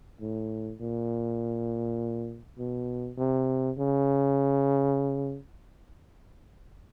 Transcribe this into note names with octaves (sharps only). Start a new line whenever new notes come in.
A2
A#2
B2
C3
C#3